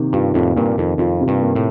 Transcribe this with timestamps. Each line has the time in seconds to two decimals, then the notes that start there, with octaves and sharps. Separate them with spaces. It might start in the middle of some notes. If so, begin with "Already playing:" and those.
Already playing: C3 D#3 A#3
0.13 G2 F4
0.34 F2 A2 C3
0.56 G2 A#2 A#3
0.77 F2 D#3
0.98 F2 F4
1.21 C3
1.28 G2
1.42 A#3
1.55 A2